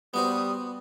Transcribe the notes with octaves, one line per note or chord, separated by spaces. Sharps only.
G3 B3 F#4 C5 D#6